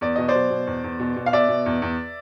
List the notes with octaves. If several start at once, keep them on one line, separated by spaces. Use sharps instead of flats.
E2 D5
B2 D#5
C5 D5
F#3
B2
E2
E2
B2
B2
F5
B2 D5 E5
B2
E2
E2